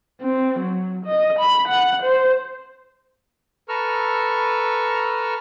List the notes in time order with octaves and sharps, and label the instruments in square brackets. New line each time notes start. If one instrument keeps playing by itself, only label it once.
[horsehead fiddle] C4
F#3
D#5
B5
F#5
C5
[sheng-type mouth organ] A4 B4 A#5 C#6 E6 F6